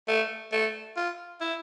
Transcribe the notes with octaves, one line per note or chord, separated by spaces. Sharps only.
A3
A3
F4
E4